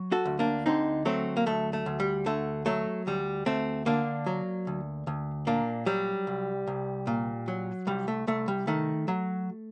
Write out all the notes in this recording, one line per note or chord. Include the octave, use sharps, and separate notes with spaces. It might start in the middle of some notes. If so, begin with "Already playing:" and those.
Already playing: F#3
F#4 A4
D2
A#3 D4
D3 C4 D#4
F#3 A3 C4
A#3
D2 A3
A3
D2
G3
D3 A3
F#3 A3
D2 G3
D2 A3 C4
D3 A#3 D4
F#3
D2
D2
A#2 A#3 D4
F#3 G3
C2
C2
A#2
F#3
C2 G3
A3
C2 A3
G3
D#3 A3
F#3